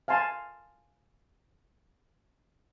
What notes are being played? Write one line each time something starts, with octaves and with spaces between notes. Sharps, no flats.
F5 G#5 A5 C6